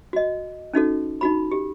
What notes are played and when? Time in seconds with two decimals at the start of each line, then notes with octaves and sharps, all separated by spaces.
0.13 F#4 D#5
0.74 C#4 D#4 F#4 A4
1.21 D#4 F#4 B5
1.51 G4